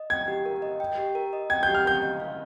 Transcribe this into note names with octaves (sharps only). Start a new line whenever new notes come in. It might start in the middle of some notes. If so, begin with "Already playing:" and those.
Already playing: D#5
G5 G#6
G4
A#4
D#5
G5
G4
A#4
D#5
G5 G#6
G4 G6
F6
A#4 G6
D#5
F5